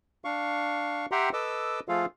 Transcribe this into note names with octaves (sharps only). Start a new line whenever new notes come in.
D4 F5 C#6
G4 E5 F#5 G5 A#5 C6
A4 B4 D#5 D6 E6
F3 A3 F4 G#4 A4 F5